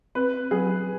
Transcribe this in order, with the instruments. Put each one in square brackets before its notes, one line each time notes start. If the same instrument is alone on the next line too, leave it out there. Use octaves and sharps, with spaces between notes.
[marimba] C4 [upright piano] B4
[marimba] F#3 [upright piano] G#4